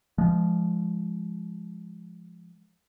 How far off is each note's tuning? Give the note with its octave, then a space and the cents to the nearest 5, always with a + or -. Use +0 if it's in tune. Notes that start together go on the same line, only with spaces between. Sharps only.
F3 -15 G#3 +0